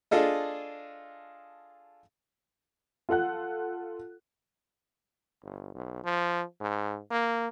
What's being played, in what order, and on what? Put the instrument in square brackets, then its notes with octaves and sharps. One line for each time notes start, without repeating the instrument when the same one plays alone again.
[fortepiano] D4 F4 G#4 A4 D#5
[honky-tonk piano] F4 A4 F#5 F#6
[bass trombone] G1
B1
F3
G#2
A#3